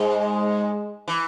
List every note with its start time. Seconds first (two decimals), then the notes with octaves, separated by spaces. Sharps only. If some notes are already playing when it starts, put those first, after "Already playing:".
Already playing: G#2 G#3
1.08 E3